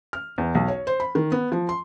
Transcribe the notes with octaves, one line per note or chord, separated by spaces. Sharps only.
F6
E2
B1
C#5
C5
B5
D#3
B3
F3
C6